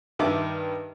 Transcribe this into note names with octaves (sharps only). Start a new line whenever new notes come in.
G2 D#3 E5 D6